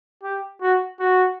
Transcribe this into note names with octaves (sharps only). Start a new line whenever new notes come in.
G4
F#4
F#4